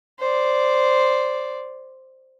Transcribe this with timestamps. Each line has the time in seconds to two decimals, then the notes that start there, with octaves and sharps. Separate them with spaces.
0.20 C5 D5